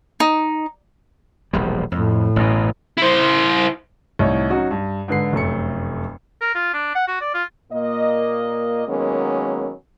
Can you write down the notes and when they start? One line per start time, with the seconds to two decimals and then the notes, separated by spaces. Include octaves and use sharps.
0.20 D#4
1.53 E1 A#1 G3
1.92 F2 A2
2.36 A1 F#2 B2
2.98 E4 C5
4.19 C2 A2 D#4 C#5
4.50 F#3 C#4 D#4 F#4
4.71 G2
5.08 G#2 D3 B4 C7
5.33 F1 F#2 A3 C#7
6.41 A#4
6.55 F4
6.73 D4
6.95 F#5
7.07 F#4
7.21 D5
7.34 F4
7.72 A#2 A#3 D#5
8.88 D#3 F#3 G#3 A#3 B3 C#4